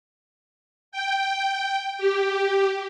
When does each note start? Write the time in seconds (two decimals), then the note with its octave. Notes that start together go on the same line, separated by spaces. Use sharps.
0.92 G5
1.98 G4